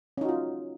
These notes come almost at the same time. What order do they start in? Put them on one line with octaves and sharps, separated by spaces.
C#4 D#4 F#4 F4